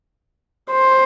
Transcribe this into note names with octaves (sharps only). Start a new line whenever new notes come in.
C5